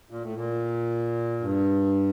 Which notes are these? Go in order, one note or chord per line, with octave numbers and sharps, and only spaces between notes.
A#2
A2
A#2
G2